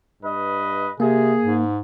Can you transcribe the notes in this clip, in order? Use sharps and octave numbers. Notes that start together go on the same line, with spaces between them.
G2 B4 D#5
C3 A#3 G#4
G#2